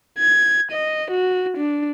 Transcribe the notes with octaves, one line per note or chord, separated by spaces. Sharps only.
G#6
D#5
F#4
D4